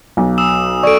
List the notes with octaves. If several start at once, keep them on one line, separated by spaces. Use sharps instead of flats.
B1
D#6 E6 E7
A4 D5 C#6 D7